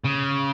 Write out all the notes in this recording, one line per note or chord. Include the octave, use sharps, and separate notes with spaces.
C#3